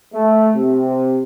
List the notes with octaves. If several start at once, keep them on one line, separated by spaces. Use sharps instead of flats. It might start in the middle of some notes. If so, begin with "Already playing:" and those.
A3
C3